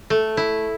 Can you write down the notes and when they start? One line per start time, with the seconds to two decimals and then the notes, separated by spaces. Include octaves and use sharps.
0.10 A3
0.37 E4